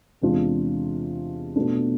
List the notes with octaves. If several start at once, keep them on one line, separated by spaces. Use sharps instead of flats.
E2 C3 G#3 D4 F4
B2 A3 D4